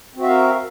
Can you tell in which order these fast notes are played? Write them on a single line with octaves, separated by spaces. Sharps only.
C4 F#4 E5 F5 A#4